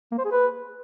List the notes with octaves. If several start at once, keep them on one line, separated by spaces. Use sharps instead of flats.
A#3
C5
G#4
B4